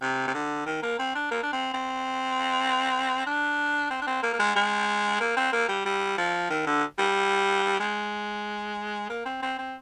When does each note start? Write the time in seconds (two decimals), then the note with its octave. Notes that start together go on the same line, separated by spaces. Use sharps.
0.02 C3
0.27 C3
0.34 D3
0.66 D#3
0.82 A#3
0.99 C4
1.15 D4
1.31 A#3
1.43 D4
1.53 C4
1.74 C4
3.26 D4
3.91 C4
4.02 D4
4.07 C4
4.23 A#3
4.33 A#3
4.39 G#3
4.56 G#3
5.20 A#3
5.37 C4
5.53 A#3
5.69 G3
5.85 G3
6.18 F3
6.50 D#3
6.66 D3
6.98 G3
7.80 G#3
9.09 A#3
9.25 C4
9.42 C4
9.58 C4